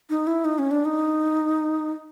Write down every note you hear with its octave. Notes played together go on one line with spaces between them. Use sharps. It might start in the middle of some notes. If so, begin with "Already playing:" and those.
D#4
E4
D#4
C#4
D4
D#4